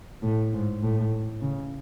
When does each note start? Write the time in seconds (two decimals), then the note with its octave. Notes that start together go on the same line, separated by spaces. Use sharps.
0.22 A2
0.53 G#2
0.82 A2
1.42 C#3